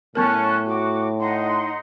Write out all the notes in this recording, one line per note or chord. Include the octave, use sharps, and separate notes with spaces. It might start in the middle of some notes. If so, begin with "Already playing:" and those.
A2 F#3 B3 C#4 A#4 A5 F#6
F#4 D6
D#4 F#5 C6